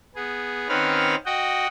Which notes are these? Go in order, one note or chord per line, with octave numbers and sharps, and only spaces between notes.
B3 G#4
D#3 C4 C#4 B4 F#5 F6
F#4 D#5 F#5 G5